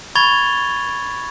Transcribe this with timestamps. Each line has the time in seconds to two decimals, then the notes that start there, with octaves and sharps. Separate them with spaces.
0.15 B5 C#6 G#6 A6 F7 G7